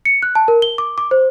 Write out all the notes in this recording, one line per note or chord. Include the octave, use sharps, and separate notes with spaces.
C#7
F#6
A5
A#4
G7
D6
D6
C5